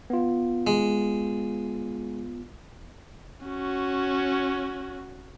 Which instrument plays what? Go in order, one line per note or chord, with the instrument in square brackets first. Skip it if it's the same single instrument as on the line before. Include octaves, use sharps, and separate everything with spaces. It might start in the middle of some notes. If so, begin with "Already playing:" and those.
[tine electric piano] B3 F4
[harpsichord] G#3
[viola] C#4 F#4